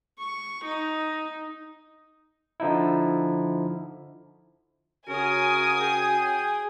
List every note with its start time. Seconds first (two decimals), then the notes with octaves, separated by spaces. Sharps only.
0.19 C#6
0.65 D#4
2.60 D3 F3 D#4 E4
5.08 C#3 C#4 F#4 A#4 G#5 D#6
5.81 G#4 G5